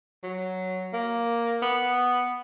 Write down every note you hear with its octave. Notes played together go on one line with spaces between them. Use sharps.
F#3
A#3
B3